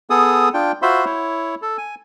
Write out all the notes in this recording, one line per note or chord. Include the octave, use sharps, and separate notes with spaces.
B3 G#4 A4 D#6
D4 F4 G5
F4 F#4 C5 E5 B5 C6
E4 C#5
A4
G#5